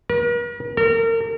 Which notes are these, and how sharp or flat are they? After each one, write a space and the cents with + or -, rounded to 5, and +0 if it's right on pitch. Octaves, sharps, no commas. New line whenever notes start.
A#4 +45
A#4 -35